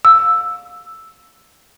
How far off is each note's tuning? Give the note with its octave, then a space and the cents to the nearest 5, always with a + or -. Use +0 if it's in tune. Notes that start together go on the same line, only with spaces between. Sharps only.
F5 +25 E6 +5